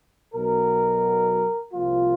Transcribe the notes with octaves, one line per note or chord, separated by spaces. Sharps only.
B1 B2 F#3 A#4
C2 C3 F3 A#3 F4